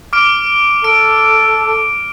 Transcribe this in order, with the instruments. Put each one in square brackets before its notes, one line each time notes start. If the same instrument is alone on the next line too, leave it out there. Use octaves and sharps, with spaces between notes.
[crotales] D6 F6 D7
[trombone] A4 [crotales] D7